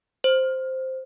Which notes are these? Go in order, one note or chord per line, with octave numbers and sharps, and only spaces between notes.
C5